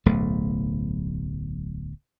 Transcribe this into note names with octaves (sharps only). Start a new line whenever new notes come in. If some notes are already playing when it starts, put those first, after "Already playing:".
D1 B1 A3